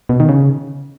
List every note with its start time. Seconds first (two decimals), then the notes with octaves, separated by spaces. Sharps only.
0.09 B2
0.20 D#3
0.29 C#3